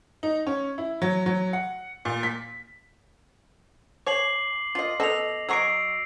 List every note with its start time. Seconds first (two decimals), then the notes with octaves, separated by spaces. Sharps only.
0.23 D#4
0.47 C#4
0.78 E4
1.02 F#3
1.26 F#3
1.53 F#5
2.05 A#2
2.23 B6
4.06 C#5 G#5 D6 C7 F#7
4.75 F4 D#5
5.00 B2 A4 D#5 A#6 F7
5.49 F#3 D#5 C#6 E6 C7 D7